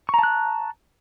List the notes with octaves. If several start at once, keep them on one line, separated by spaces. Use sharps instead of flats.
A5 A#5 C#6 F#6